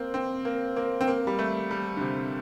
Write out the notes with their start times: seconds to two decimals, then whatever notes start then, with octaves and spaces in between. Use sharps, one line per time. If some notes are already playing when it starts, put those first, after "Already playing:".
Already playing: A#3 C4
0.14 C4
0.45 A#3
0.76 A#3
1.01 C4
1.08 A#3
1.27 G3
1.39 A3
1.71 G3
1.97 D3
2.01 C3